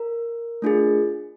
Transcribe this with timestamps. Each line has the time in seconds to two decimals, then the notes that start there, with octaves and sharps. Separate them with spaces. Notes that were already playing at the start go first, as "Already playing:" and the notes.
Already playing: A#4
0.62 A3 D4 F4 G#4